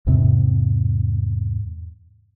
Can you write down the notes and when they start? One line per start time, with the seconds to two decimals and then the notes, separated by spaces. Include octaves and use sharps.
0.07 E2 G#2 C3 C4